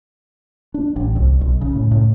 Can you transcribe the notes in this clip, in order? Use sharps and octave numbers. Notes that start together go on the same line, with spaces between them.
D4
A1
C2
B1
C#3
A2
A2